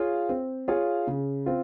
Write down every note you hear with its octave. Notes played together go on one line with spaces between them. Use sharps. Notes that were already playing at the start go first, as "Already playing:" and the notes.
Already playing: F4 G#4 C#5 F5
C4
F4 G#4 C#5 F5
C#3
C4 F4